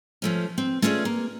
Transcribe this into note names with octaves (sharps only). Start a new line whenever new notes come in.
F3 A3 C#4
C4
A3 C#4 E4 F4 G#4 D5
A#3